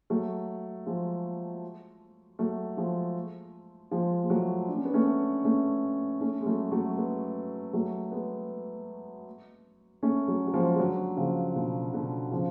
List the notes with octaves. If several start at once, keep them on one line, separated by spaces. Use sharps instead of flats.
F#3 A3
F3 G#3
F#3 A3
F3 G#3
F3 G#3
G#3
F#3 A3
D4
C#4
B3
A3 C#4
B3 D4
A3 C#4
A3 C#4
G#3
F#3 A3
F#3 A3
G#3 B3
F#3 A3
G#3 B3
A3 C#4
F#3 A3
F#3
F3 G#3
G#3
D3 F#3
C#3 F3
B2 D3
B2 D3
C#3 F3